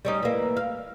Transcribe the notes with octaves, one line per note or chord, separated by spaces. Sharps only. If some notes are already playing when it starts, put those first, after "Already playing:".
G3 C#4 D#4
E3 A#3
F5